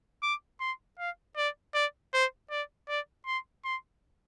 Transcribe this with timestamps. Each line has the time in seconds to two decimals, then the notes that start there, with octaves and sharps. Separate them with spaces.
0.23 D6
0.60 C6
0.99 F5
1.37 D5
1.74 D5
2.13 C5
2.51 D5
2.89 D5
3.26 C6
3.64 C6